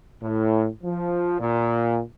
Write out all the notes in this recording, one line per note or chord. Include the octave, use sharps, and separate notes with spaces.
A2
F3
A#2